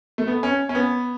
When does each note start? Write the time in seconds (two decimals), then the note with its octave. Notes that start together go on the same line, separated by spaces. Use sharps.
0.18 A3
0.27 B3
0.43 C#4
0.69 C#4
0.75 B3